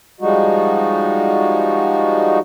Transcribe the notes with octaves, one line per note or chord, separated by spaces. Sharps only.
F3 G3 G#3 D#4 F#4